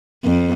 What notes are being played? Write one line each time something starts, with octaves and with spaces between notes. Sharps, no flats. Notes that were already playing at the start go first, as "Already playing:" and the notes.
F2